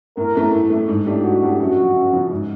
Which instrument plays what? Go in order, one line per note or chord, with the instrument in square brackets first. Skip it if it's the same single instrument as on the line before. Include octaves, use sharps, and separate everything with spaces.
[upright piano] A2 [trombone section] A#4
[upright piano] E3 A3
A2
E3 A3
G#2
E3 A3 D4 G4
[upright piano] G#2 [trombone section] F#4
[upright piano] E3 A3 D4 G4
[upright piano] F#2 [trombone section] F#4
[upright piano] C#3 F3
F#2
C#3 F3
G#2